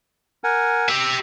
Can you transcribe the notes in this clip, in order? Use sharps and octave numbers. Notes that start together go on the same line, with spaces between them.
A#4 F#5 G#5
G4 E5 E6